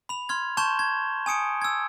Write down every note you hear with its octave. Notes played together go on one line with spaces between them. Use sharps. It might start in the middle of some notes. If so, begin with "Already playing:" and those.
B5 F7
C6 F6 G#6
A5 C6 C#6 G6 E7 G7
G#6
G#5 D#6 C#7 D7
E6 G#6